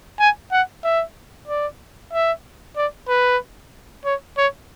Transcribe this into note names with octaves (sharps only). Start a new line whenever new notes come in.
G#5
F#5
E5
D5
E5
D5
B4
C#5
C#5